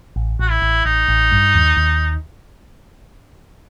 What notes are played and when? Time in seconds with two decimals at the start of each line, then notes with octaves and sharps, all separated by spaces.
0.16 A1
0.39 A1 F#4
0.51 E4
0.62 A1
0.85 A1 D#4
1.08 A1
1.32 G2
1.55 D#2
1.77 D#2